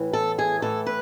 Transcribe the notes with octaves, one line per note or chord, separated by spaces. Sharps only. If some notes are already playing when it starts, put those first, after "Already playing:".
Already playing: A2 E3
A4
G#4
A2 E3 A4
B4